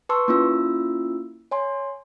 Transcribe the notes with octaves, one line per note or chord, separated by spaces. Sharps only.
B4 A5 C6 C#6 E6
A#3 C#4 E4 F4 E6
C#5 G#5 C6